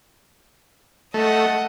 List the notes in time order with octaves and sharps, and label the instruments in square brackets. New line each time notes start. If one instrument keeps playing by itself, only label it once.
[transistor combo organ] A3 [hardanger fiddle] D#5 F#5